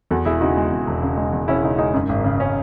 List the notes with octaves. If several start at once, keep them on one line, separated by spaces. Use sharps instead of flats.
E2 F#4 A4
E1 E4 G#4
C#3 D#4 F#4
G#3
E2
E1
C#3
G#3
E2
E1 C#4 E4
C#3 D#4
G#3 D#4
F#2 D#4
G#1
C#3
C#4